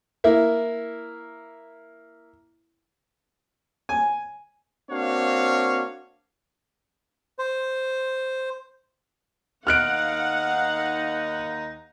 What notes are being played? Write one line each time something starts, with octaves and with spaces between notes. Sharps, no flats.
A#3 E4
G#5
A#3 C4 D4 F#4 C#5 F5
C5
D#2 D#4 F5 F#5 F6 F#6 D7